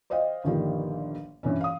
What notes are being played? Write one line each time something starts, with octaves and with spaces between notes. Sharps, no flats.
C5 D5 D#5 F5 G5
G1 A#2 D3 D#3 F3 G3
G2 C3 E3 C#4
F5 D#6